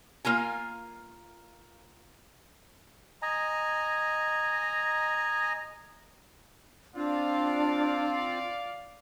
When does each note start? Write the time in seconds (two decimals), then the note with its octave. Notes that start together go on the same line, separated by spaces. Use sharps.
0.25 A#3 F4 A#4 G#5
3.22 D#5 G#5 A#5
6.96 C4 D4 F4 D5 F5